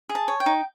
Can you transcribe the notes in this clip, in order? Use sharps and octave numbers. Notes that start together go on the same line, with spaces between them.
G#4
A5
C#5
G5
D#4